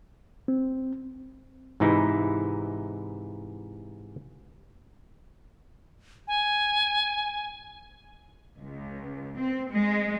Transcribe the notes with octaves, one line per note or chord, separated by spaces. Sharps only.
C4
G#2 C3 E3 D#4 E4
G#5
C#2
C4
G#3